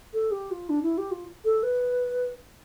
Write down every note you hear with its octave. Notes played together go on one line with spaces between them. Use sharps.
A4
G4
F4
D4
E4
G4
F4
A4
B4